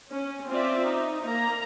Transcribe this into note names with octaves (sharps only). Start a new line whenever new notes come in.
C#4
C4 F4 D5 E5
D#4
A#3 A#5